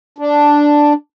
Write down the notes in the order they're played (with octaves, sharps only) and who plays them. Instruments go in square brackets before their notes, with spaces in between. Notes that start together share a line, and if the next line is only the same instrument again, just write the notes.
[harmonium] D4